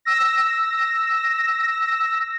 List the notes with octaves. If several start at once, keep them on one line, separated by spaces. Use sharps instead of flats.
E6 A#6